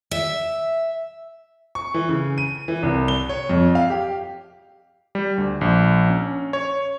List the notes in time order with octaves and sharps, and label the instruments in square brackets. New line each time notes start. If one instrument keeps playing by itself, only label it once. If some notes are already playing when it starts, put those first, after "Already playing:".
[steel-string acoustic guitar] E5
[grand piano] C#6
E3
C#3
D#7
E3
C2
G7
C#5
F2
F5
G4
[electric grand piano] G3
D2
A#1
C#4
C#5